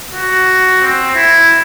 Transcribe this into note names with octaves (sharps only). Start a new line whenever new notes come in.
F#4
C4
E4